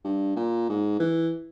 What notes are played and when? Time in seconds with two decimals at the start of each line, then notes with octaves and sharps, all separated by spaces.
0.04 G2
0.36 A#2
0.69 G#2
1.00 E3